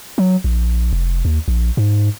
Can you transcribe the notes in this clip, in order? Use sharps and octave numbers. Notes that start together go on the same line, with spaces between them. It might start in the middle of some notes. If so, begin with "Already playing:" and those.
F#3
A#1
F1
D#2
A#1
G#2